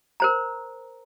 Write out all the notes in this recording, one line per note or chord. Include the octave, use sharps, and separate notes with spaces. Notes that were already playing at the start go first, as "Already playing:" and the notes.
A#4 C5 A#5